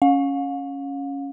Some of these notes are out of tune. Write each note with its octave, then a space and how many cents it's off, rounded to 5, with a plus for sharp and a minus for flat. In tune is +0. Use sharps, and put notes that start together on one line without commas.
C#4 +0 F5 +40